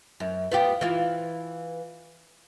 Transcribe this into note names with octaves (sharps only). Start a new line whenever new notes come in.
F#2
B3 F4 G4
E3 F4